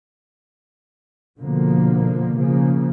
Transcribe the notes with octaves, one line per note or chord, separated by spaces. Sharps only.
B2 D3 F3 A#3
C#3 F3 A#3